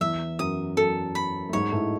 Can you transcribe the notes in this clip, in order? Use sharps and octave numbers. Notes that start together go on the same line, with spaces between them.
E2 E3 E5
F#2 F#3 D#6
F#2 F#3 A4
B5
A3
G#2 G#3 C#5
A2 A3